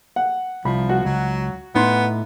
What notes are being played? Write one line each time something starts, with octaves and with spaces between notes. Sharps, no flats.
F#5
C2 F3 B5
F#4
C#2 F#3
A2 B3 D#4 C6